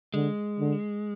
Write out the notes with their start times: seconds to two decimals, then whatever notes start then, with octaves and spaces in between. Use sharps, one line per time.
0.14 D3 G#3
0.60 D3